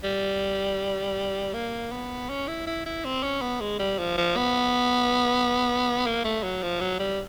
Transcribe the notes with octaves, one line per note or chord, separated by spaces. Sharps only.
G3
A#3
B3
C#4
E4
E4
E4
C4
C#4
B3
G#3
G3
F3
F3
B3
A#3
A3
F#3
F3
F#3
G3